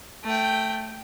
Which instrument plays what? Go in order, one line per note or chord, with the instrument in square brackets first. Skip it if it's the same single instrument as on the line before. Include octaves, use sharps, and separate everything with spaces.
[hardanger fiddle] A3 G5